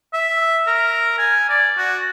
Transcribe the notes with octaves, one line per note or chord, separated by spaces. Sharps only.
E5
A#4
G#5
D5
F#4